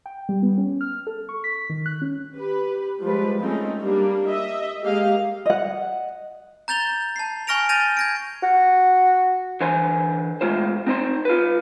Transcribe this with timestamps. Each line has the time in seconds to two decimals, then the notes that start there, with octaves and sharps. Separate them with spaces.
0.06 G5
0.29 G3
0.43 B3
0.58 C#4
0.81 F6
1.07 A4
1.29 C#6
1.44 B6
1.70 D#3
1.86 F#6
2.02 C#4
2.37 G4 B4
3.01 F3 G3 G#3 B4
3.41 G#3 A3 C4 C#4 D#4 F4
3.80 G3 A#3 D4
4.27 D#5 E5
4.81 G#3 A#3 G4 D#5 F5
5.46 D#5 F#5
6.68 A#5 G6 A6 F7 G7
7.16 A5 C7
7.47 G#5 C#6 F6 A#6 D7 F7
7.69 F6 G6 A6 A#6 D#7 F7
7.97 G#6 A#6 D7
8.43 F#4
9.61 D3 E3 C5 G#5 C6
10.41 A2 G#3 A#3 F4 C5
10.87 C4 D#4 C5 C6
11.25 F4 B4